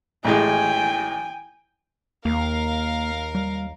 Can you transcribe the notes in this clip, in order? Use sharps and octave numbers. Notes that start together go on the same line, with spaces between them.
A1 A2 G#3 G5 G#5
D#2 A#3 A#4 F5
G3